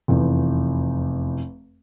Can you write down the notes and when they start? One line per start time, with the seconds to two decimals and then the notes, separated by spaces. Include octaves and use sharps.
0.08 F1 E2